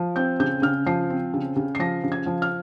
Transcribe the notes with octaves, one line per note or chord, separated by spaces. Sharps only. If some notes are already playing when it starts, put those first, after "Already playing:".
Already playing: F3
C4 G6
C#3 G6
C#3 F6
F3 C7
C4
C#3
C#3
C7
F3 A#6
C#3
G#6
F3
F6